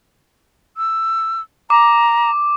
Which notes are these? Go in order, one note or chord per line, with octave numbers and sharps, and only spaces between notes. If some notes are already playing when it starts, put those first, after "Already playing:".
E6
A#5 D6